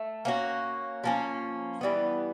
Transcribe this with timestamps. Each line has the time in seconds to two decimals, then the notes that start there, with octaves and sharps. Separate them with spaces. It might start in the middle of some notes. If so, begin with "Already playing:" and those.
Already playing: A3
0.25 A#3 C#4 F#4
1.04 F3 A#3 C#4
1.81 E3 G3 B3